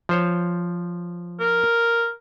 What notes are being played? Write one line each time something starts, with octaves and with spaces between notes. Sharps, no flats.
F3 C5 C#5
A#4